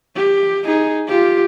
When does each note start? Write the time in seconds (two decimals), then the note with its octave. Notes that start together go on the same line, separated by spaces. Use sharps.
0.16 G4
0.64 D#4 G#4
1.08 F4 G4